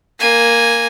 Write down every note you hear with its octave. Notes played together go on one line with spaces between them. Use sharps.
A#3 G#5